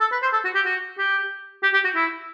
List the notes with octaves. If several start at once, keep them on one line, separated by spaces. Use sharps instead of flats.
A4
B4
C5
A4
F#4
G4
F#4
G4
G4
G4
F#4
E4